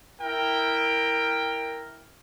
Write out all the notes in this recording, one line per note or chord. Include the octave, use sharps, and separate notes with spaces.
E4 A#4 G5